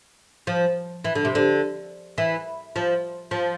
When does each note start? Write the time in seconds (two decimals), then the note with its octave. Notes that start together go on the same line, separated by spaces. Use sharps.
0.47 F3
1.04 E3
1.15 D3
1.25 C3
1.35 D3
2.18 E3
2.76 F3
3.31 F3